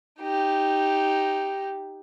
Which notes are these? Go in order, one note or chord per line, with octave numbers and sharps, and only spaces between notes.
D#4 G4